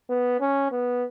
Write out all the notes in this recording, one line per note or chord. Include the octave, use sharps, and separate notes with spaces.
B3
C#4
B3